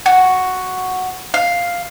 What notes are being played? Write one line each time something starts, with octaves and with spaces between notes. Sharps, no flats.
F#4
F5